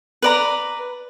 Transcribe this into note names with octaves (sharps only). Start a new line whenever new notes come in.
B4 D5 A#5